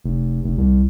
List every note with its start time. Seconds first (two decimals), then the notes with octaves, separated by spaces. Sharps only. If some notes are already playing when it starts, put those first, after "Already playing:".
0.04 F1
0.44 F1
0.58 C2